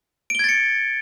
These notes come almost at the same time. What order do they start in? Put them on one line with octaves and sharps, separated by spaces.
D7 G7 G#6 A6 C#7